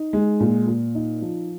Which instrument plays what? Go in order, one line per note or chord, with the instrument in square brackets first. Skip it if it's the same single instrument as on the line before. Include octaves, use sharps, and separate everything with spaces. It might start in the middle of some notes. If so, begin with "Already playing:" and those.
Already playing: [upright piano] D#4
G#3
A#2
A#2
D#4
F3